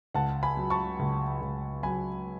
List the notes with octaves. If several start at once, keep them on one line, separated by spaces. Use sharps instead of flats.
C#2 F#5 A5
G#5 B5
F#3
A5 C#6
C#2
C#2
F#3 G#5 B5